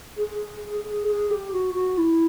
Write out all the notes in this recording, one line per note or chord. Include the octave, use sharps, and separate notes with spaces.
G#4
G#4
G4
F#4
F#4
E4